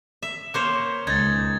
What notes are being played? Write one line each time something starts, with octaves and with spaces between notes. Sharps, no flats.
E5
A#3 C5 C#5
C#2 D#4 G#6 A6